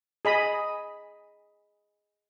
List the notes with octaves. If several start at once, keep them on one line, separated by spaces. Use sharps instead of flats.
G#4 D#5 B5